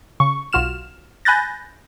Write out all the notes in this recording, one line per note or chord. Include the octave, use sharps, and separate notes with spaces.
C#3 C#6
B1 F4 F#4 F6 E7
G#5 B5 F#6 G6 A6 A#6